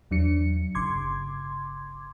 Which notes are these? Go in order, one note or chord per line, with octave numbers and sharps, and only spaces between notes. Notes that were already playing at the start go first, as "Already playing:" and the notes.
E2 F#3 D4 C#7
G1 C#3 C6 D6 G#6